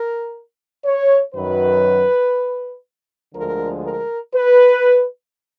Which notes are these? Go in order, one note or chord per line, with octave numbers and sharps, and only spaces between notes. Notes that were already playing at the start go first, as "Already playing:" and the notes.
Already playing: A#4
C#5
F#2 D#3 F#3 B4
D2 D3 F3 G#3 A#4
A#4
B4